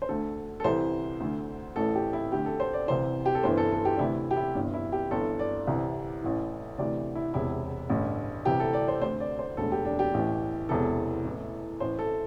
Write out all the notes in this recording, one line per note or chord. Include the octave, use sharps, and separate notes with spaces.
C5
D2 D3 A4
A4
C2 C3 E3 C5
D2 D3
A1 A2 E3 A4
G4
E4
D2 D3 G4
A4
C5
D5
C2 C3 E3 C5
G4
A4
G1 G2 E3 C5
A4
A4
G4
D4
D2 C3 E3 E4
G4
E4
G1 G2 E3
E4
G4
G1 G2 E3 A4
D5
C2 C3 E3
A1 A2 E3
D2 C3 E3 D5
E4
E1 E2 C3 E4
A1 G2 D3
C2 C3 E3 G4
A4
D5
C5
D2 D3 C5
D5
C5
E1 D2 D3 A4
G4
D4
G4
A1 A2 E3
E1 E2 C3 E3 A4
A1 A2 E3
A1 A2 E3 C5
A4